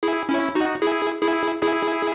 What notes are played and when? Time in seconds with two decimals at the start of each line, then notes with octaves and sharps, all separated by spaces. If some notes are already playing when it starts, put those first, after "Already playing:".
0.03 E4 G#4
0.29 C#4 E4
0.55 D#4 F#4
0.82 E4 G#4
1.23 E4 G#4
1.62 E4 G#4